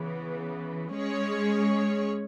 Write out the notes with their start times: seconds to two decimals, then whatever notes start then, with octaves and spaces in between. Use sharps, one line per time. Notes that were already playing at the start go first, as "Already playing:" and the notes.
Already playing: C#3 E3 B3
0.92 G#3 C#4 G#4 C#5